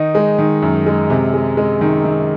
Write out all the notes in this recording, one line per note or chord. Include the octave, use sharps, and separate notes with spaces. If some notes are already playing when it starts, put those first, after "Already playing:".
Already playing: D#3 D#4
G#3
D#3
F#2
G#3
C3
G#3
G#3
D#3
D#3